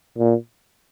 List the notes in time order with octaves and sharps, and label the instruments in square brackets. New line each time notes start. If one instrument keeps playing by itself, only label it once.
[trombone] A#2